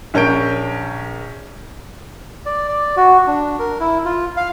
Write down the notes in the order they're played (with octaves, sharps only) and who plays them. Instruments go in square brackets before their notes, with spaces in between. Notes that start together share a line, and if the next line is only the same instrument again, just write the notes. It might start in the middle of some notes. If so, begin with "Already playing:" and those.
[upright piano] A#1 C#4 A#4 G6 D7
[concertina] D5
D5
F#4
D4
A#4
E4
F4
F5